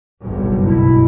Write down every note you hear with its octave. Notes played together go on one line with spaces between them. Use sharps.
F#1 B1 G2
B2 E4